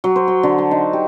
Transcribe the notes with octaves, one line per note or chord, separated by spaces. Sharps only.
F#3
C5
C6
D3
A5
D#4
G4